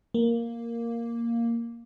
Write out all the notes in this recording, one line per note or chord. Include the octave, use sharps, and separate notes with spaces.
A#3